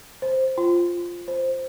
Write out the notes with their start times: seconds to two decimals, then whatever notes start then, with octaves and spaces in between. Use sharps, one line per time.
0.22 C5
0.58 F4
1.28 C5